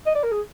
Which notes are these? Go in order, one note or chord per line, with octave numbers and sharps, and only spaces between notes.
D#5
D5
A#4
G#4